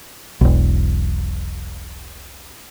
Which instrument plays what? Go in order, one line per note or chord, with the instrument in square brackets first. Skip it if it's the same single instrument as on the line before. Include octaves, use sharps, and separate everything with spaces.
[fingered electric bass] E1 B1